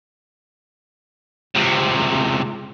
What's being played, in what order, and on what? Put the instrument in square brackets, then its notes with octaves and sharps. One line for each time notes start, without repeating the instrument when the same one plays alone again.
[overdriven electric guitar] C#2 C3